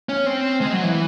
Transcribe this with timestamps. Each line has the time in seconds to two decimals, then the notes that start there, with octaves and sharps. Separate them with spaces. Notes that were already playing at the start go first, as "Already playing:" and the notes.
0.09 C#4
0.26 C4
0.61 G#3
0.73 F#3
0.83 E3